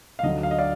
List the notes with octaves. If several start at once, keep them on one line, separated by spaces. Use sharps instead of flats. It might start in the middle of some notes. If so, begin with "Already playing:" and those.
F5
D2 D3 F#3 D#5
F5
D#5
D5 F5